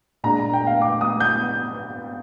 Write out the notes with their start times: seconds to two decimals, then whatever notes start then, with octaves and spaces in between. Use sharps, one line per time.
0.24 A#2 G#3 D4 A#5
0.53 G5
0.67 F5
0.81 D6
1.01 D#6
1.20 G6